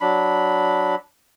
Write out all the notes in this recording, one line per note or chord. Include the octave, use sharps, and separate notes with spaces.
F#3 D4 B5